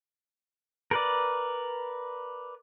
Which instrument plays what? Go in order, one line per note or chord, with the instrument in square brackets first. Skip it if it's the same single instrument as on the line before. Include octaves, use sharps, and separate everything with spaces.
[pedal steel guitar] A#4 B4 D5